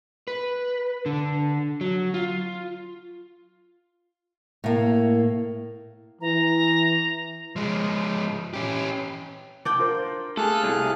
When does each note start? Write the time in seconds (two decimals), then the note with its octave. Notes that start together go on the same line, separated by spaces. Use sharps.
0.28 B4
1.06 D3
1.81 F#3
2.14 F4
4.64 A2 A#3
6.21 E3 A#5
7.56 F3 G#3
8.54 C#4 G4
9.65 D4 D5 G5
9.79 F4 A#4 C5
10.37 A3 G#4 A4 F5 F#6
10.63 C2